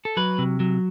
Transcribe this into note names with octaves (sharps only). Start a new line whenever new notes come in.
A4
F#3 B4
C3
F#3